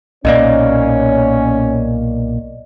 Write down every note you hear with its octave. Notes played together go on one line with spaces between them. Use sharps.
B1 A#2 A#3 C#4 D5 D#5